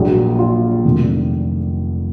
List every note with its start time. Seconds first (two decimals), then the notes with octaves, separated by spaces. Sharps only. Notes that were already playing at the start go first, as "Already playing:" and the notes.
Already playing: A#1 A#2 F#3
0.39 F4
0.85 F1 F2 D#3 F#3